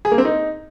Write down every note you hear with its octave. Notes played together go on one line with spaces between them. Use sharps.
G#4
A#3
C4
D#4